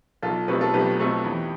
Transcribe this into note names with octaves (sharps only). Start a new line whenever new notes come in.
B1 F4 A4
B2 A3 C4 G4 B4
F4 A4
B1 G4 B4
B2 A3 C4
E2